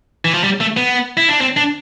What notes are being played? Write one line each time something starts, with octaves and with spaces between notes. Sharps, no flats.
E3
F3
G3
A3
B3
E4
D4
C4
D4